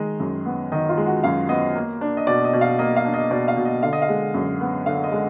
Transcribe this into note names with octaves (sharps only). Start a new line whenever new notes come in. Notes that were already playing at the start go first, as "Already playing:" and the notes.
Already playing: D#3 G#3 D#5
F#2
B3
D#3 D#5
F4
G#3
F#4
F#2 F5
B3 D#5
A#3
D4
D#5
B2 D5
D#5
B2
F5
A#3 D#5
F5
D4
D#5
B2 D5
F5
B2
D#5
D3 F5
D#5
F5
G#3
F#2
B3
D3 F5
D#5
G#3